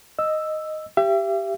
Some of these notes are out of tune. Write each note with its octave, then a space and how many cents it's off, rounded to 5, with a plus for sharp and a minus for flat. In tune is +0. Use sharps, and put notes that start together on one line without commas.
D#5 +0 E6 +0
G4 +0 E5 +40